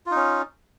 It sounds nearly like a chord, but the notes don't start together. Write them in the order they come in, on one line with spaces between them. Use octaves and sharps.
F4 D#4 C#4